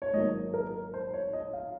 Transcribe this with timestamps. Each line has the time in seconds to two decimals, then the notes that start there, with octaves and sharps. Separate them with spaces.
0.02 C#5
0.13 G#1 G#2 F#3 A#3 D#5
0.54 A#4
0.94 C5
1.14 C#5
1.33 D#5
1.53 F5